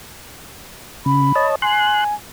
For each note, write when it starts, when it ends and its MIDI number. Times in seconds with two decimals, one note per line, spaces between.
1.06 1.32 49
1.06 1.46 83
1.36 1.55 73
1.36 1.55 75
1.36 1.55 81
1.62 2.14 80
1.62 2.04 84
1.62 2.04 90